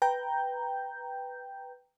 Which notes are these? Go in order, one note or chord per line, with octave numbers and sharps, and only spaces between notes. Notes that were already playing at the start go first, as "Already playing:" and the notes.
B4 G5 A#5 G6